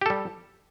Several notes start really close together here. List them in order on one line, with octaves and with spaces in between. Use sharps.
G4 A4 G3